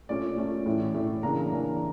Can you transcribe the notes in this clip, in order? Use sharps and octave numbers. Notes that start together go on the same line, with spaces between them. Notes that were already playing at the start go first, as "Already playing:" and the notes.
A#2 A3 C#4 D5
A#2 A3 C#4
A2 E3 A3 C#4
A2 E3 A3 C#4
C#3 E3 A#3 D4 A#5
C#3 E3 A#3 D4